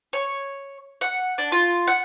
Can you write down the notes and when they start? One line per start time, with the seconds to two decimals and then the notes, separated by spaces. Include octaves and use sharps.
0.13 C#5
1.01 F#5
1.38 D4
1.52 F4
1.87 F#5